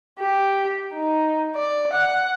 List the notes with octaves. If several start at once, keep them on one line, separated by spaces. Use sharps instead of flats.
G4
D#4
D5
F#5